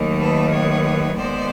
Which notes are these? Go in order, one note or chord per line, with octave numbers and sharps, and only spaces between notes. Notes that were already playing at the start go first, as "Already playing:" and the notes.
Already playing: D#2 D#3 F#3 A3
A4 B4
B4 C#5
D#2 D#3 G#3 B3 C5 D5